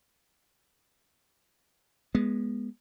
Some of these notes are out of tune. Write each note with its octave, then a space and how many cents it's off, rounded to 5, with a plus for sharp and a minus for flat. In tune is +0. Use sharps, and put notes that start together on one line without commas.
G#3 +0 B3 -20